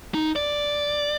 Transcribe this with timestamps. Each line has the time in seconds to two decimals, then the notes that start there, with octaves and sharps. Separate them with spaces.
0.14 D#4
0.36 D5